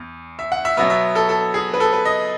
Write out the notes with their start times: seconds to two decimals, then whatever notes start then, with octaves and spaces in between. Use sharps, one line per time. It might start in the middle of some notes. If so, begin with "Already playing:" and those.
Already playing: E2
0.39 E5
0.52 F#5
0.65 E5
0.77 B2 F#3 B3 E5
0.90 E5
1.15 A4
1.29 A4
1.54 G#4
1.74 B4
1.80 A4
1.93 B4
2.05 D#5